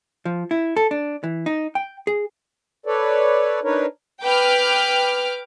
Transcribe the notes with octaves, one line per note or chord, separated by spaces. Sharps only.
F3
E4
A4
D4
E3
D#4
G5
G#4
A4 B4 C#5 D5
D4 D#4 A#4 B4 C#5
B4 G5 D6 F6